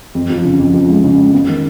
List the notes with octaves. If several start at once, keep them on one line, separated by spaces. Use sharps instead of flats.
F2
F3
C#3
F2
F3
G#3
C#3
G#3
B3
D#3